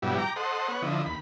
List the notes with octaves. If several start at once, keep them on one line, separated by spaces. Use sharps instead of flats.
G2 B2 F#3 G3 E4
G5 A#5 D6
A4 C5 D#5 F#5
B3 C#5 F#5
D3 F3 E4 D#5
D#2 B5